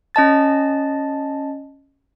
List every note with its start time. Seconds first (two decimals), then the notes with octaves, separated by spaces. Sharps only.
0.15 C#4 D#5 A5 A6